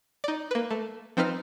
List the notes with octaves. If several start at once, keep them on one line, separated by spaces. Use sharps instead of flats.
D#4 D5
A#3 B4
A3
F3 C4 D#4 B4 F6